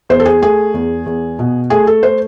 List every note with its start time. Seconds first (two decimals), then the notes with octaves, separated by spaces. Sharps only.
0.09 E2 C5
0.20 A4
0.26 G#4
0.42 A3 G#4
0.74 E2
1.06 E2
1.39 B2
1.70 A3 G#4
1.87 A4
2.03 A3 C5